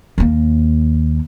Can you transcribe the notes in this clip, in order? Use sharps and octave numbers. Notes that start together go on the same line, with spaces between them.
D#2 A#3